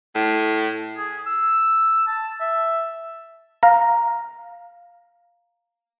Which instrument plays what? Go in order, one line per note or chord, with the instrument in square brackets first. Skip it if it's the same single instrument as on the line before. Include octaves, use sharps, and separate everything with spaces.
[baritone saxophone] A2
[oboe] G#4
E6
A5
E5
[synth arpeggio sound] F5 A#5